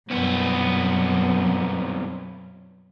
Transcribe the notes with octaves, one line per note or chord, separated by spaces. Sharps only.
C2 F#2 B2 B3